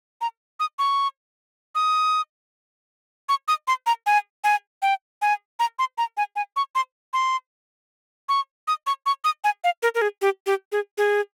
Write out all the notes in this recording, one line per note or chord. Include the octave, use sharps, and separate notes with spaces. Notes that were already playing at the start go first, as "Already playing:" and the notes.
A#5
D#6
C#6
D#6
C#6
D#6
C6
A#5
G#5
G#5
G5
G#5
A#5
C6
A#5
G#5
G#5
C#6
C6
C6
C#6
D#6
C#6
C#6
D#6
G#5
F5
A#4
A#4
G#4
G4
G4
G#4
G#4